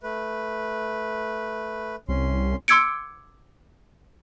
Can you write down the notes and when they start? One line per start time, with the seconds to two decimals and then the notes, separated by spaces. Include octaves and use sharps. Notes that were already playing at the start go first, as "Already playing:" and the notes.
0.03 A3 B4
2.09 C2 C#4 C6
2.68 C6 D6 E6 G#6 C#7 D7